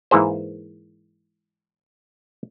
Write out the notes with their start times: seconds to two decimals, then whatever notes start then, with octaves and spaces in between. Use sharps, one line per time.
0.11 G#2 E3 A#3 G#4 C5